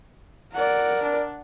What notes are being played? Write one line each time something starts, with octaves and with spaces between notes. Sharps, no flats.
A#4 D5 F#5
D4